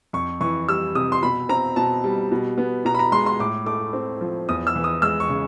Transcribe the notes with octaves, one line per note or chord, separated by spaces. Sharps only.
F2 C#6
E3 C#6
G3 E6
C3 D#6
C6
B2 B5
C4 A#5
B2 A5
G3
B2
B3
B2 A#5
B5
A#5
G#3 C6
C6
A2 D6
A3 D6
C4
F3
E2 D#6
E6
E3
D#6
G#3 E6
C#6
C#3